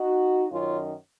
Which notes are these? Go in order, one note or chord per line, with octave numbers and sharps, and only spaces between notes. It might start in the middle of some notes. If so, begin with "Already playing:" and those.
Already playing: D#4 F#4
F#2 D#3 C#4 F4